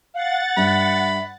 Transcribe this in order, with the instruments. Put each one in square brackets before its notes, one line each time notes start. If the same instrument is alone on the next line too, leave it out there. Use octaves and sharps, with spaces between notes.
[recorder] F5 [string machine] F#5 A6
[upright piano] G2 [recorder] E5 [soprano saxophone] B5